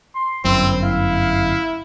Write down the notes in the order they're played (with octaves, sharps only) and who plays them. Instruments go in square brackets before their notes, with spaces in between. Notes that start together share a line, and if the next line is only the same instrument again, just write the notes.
[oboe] C6
[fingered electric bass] G1 F#2 [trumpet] C4 [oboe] E4
[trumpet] E4 [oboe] F5